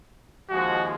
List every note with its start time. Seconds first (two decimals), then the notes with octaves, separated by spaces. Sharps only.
0.50 D#2 F3 G#3 F#4